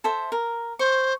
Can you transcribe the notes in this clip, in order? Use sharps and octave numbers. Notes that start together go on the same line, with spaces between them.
A4 C5 E5
A#4
C5 C#6